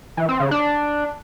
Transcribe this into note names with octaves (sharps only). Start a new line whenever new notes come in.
E3
C4
C#3
D4